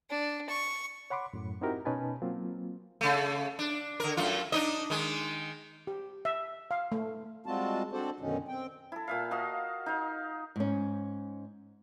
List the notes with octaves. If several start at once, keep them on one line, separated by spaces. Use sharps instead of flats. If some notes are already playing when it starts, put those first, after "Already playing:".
D4
C#6
C#5 F#5 B5 C6 D6
F#2 A2
C4 D#4 E4 F#4 G4 A#4
B2 C#4 D#4 B4 G#5 A5
F#3 A#3 C4 F4
C#3 A3
D4
D3 A#4
F#2 A3 F4
D4 D#4 D#5
D#3 G#3
G4
E5
F5
A3
G3 G#3 C4 F4 F#4 A5
C4 D4 F#4 A4 C5 D5
F#2 B2 D3 D#3 C#4 D#4
C4 G5
E4 A4
A#2 E5 F5
F#4 D#5 F5 A5
D#4 F5
G#2 C#4